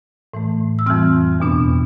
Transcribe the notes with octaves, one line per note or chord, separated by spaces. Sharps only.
A2 E3 A3
E6
F2 E3 G3 C4 F6
E2 B2 B3 D4